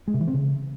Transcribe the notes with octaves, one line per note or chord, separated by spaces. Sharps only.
G#3
C3
E3
C4
C#3